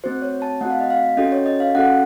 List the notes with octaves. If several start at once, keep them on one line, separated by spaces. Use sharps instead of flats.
A3 C4 F#4 C5
C#5
A5
A3 C4 F#4 F#5
F5
D#5
F5
C#4 F#4 A4 D#5
C#5
D#5
F5
C#4 F#4 A4 F#5